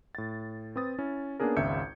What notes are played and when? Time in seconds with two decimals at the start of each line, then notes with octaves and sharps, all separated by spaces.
0.15 A2 A6
0.76 C4 B4 D#6 A6
0.99 C#4 E4
1.40 A#3 B3 C#4 D4 G#4 A#4
1.57 G#1 C#2 E5 G6 G#6 C#7